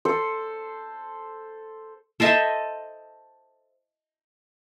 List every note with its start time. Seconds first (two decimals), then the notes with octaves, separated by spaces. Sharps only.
0.05 A4 C5
2.20 A4 C5 D#5 E5